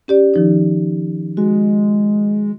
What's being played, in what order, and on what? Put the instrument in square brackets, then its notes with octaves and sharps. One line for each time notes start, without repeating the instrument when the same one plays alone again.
[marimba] C#4 G4 D5
D#3 F3 D#4
[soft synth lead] G#3 [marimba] F#4